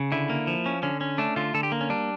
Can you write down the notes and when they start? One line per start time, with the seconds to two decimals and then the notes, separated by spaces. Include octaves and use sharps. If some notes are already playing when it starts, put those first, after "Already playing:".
Already playing: C#3
0.12 D3 E4
0.29 A#3
0.47 F3
0.66 C#4
0.83 D3 C#4
1.01 C#4
1.18 A3 D4
1.36 D3 F4
1.54 D3 A4
1.63 G4
1.72 A#3
1.81 C#4
1.90 G3 D4